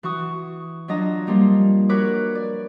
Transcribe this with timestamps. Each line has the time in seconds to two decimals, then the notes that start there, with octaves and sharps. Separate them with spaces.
0.03 E3 F#4 C#6 D#6
0.88 F#3 D4 F4 D#5 A5 A#5
1.27 F3 G3 A#3 F4
1.89 F#4 A#4 B4 C#5 D6 F#6
2.35 D5